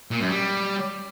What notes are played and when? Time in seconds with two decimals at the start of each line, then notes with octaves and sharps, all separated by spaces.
0.11 A#2
0.21 F#2
0.30 G3